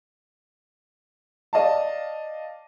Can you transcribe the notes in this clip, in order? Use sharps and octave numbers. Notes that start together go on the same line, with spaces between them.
D5 D#5 F5 A5